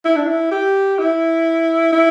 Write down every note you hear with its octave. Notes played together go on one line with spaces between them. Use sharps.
E4
D4
E4
G4
E4
E4